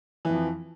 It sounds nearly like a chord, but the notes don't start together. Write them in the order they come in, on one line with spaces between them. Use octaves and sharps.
E3 F2 F3